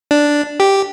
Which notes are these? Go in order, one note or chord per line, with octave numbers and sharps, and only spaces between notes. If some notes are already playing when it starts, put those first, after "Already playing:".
D4
G4